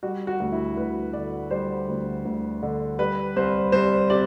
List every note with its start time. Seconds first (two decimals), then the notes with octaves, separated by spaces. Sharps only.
0.03 G3 F#4
0.27 F#4
0.40 D2
0.52 E4
0.76 D2 B4
1.13 D3 D5
1.51 G3 C5
1.88 D2
2.25 D2
2.63 D3
2.99 G3 B4
3.36 C2 C5
3.72 C2 C5
4.10 C3 D5